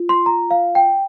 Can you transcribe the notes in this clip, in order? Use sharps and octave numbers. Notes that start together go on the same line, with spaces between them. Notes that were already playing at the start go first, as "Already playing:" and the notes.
Already playing: F4
C6
A#5
F5
G5